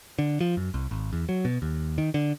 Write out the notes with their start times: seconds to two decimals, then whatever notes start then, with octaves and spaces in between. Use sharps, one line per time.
0.19 D3
0.41 F3
0.57 F#2
0.74 C2
0.91 G#1
1.13 E2
1.29 F#3
1.45 B2
1.62 D#2
1.98 D#3
2.14 D3